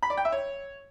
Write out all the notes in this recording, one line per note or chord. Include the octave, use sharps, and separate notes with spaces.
B5
D5
G5
E5
C#5